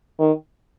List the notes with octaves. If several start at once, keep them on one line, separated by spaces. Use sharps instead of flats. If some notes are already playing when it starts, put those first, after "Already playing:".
D#3